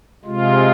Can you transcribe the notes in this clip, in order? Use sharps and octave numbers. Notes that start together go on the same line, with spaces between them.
C3 G#3 F4